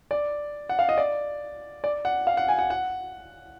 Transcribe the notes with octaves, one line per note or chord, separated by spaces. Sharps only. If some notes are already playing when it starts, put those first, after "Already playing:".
D5
F#5
F5
D#5
D5
D5
F#5
F5
F#5
G#5
F#5
F#5